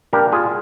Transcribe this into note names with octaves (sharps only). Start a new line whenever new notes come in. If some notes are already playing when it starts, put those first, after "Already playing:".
G3 A#3 D4 G4 A#4
F4 G#4